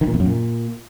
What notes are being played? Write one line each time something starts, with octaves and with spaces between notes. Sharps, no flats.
D#3
A#2
E2
F#2
A#2